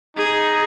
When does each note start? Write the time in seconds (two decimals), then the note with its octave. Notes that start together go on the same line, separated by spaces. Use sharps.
0.16 D#4 G#4